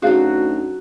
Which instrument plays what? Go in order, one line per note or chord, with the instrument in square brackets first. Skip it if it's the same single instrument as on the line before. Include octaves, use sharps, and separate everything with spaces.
[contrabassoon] D2 [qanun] F#3 F#4 [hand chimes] C#4 D#4 [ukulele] G#4 F5